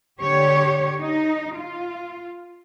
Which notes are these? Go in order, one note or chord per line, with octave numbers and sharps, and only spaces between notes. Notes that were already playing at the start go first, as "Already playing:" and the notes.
D3 G4 C#5
D#4
F4